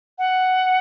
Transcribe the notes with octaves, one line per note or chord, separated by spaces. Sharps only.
F#5